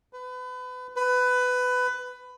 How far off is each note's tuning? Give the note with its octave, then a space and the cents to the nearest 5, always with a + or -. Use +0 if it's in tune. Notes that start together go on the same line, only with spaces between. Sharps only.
B4 +30
B4 +20